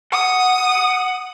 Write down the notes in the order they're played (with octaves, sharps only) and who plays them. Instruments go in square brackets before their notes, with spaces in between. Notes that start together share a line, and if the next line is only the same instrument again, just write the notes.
[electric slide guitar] F#5 [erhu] D#6